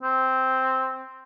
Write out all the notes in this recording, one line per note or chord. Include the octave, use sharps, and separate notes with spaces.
C4